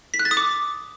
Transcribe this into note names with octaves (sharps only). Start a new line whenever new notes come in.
B6
F#6
A6
D#6
D6